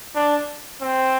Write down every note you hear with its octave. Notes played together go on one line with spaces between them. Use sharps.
D4
C4